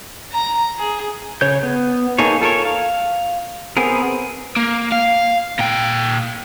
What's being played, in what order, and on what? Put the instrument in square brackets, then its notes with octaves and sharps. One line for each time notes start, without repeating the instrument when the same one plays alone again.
[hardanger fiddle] A#5
G#4
[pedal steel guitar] C#3 C#5 G6
B3
A#3 D#4 G#4 A4 C#5
F4 A4 A#4 C#5
F5
B3 C4 G#4 A#4
[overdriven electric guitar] A#3
F5
A#2 G5